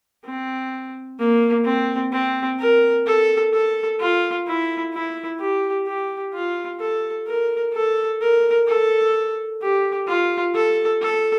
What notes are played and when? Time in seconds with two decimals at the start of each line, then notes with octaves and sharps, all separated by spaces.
0.25 C4
1.19 A#3
1.65 C4
2.12 C4
2.59 A#4
3.07 A4
3.53 A4
4.00 F4
4.47 E4
4.93 E4
5.39 G4
5.87 G4
6.34 F4
6.80 A4
7.27 A#4
7.74 A4
8.21 A#4
8.67 A4
9.62 G4
10.08 F4
10.55 A4
11.02 A4